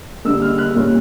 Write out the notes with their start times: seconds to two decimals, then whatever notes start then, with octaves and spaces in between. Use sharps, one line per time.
0.25 D3 G3 A#3 E6
0.42 F6
0.58 F#6
0.75 A#2 G3 A#3 C#4